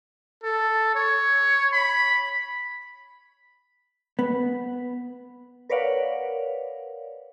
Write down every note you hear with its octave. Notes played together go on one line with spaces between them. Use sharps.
A4
C#5
B5
B3
A#4 B4 C#5 D5 F5 F#5